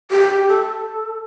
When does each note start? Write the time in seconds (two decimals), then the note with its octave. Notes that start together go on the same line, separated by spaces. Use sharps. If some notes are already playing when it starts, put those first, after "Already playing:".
0.11 G4
0.49 A4